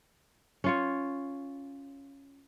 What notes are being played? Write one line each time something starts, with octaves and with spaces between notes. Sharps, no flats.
C#4 F4 C#5